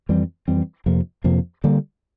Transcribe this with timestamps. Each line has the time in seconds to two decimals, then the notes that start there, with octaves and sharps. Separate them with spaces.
0.09 F2 E3 G3 C4
0.48 F2 E3 G3 C4
0.86 F2 C3 F3 A#3
1.24 F2 C3 F3 A#3
1.64 D3 G3 A#3